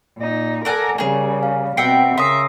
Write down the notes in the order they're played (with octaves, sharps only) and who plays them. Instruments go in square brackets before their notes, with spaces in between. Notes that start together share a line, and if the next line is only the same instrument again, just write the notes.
[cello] A#2 D#4
[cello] A4 A#4 [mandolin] D5 F#5 G#5
[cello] C#3 G3 [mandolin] A#3 G#4 [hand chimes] G#5
[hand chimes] F5
[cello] B2 C4 [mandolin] E5 F#5 G5 [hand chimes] C7
[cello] C#3 A#4 [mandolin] E5 [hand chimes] C6 D#6 C7